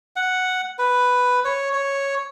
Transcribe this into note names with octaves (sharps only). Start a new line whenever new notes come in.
F#5
B4
C#5
C#5